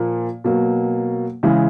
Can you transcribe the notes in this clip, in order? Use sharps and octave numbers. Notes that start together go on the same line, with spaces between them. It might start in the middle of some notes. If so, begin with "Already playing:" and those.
Already playing: A#2 F3 A#3
B2 F#3 A#3
C#3 E3 G#3